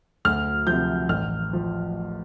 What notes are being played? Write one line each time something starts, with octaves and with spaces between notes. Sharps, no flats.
D2 F6
C3 F3 G6
A1 F6
F3